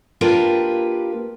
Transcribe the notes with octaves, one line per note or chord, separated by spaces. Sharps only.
A#3 D4 F4 G4 A#4 B4